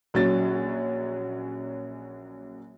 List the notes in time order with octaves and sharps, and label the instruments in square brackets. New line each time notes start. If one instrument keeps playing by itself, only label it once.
[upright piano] A#1 F#3 C#4 A6